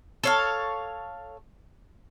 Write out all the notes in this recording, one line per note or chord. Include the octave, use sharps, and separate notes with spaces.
A4 C#5 F5